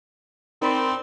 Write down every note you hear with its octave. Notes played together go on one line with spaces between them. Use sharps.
C4 D#4 A#4 D5 B5 C6